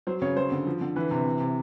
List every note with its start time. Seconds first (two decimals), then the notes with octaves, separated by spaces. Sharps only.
0.07 F#3 C5
0.22 C#3 C#5
0.36 F#3 C5
0.52 D3
0.66 F3
0.81 D3
0.96 E3 B4
1.11 C3
1.26 E3
1.40 C3